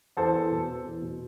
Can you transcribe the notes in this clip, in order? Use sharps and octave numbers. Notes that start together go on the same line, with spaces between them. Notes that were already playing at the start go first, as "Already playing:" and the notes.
E2 A4 C5
E2
B2
B3
E2
B2